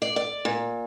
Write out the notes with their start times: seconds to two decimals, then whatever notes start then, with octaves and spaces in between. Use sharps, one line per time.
0.02 D5
0.16 D5
0.45 A#2